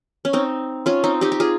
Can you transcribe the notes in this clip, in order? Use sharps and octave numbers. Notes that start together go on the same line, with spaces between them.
C#4
C4 D#4
C#4 F4
C4 D#4
D#4 G4
G4
F4 G#4